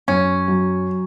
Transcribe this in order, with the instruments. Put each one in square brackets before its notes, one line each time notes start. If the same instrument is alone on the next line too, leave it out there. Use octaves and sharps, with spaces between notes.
[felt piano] F#2 [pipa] C#4
[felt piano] F#3